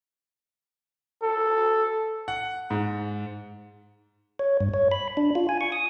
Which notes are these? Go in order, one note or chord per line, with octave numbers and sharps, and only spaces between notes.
A4
F#5
G#2
C#5
G2
C#5
B5
D4
F4
G#5
C#6
D#6